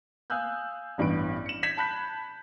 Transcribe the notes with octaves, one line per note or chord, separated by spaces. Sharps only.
F5 G#5 D#6 E6 F#6 G6
A1 G2 E3 B3 D7
C#7 E7
G6 G#6 B6 E7
A5 B5 F#6 G6 B6